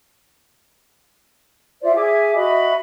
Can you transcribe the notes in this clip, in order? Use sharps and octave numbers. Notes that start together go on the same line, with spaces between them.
F4 C5 D5 E5
G#4 E5 G#5 D6
F#4 D#5 E5 B5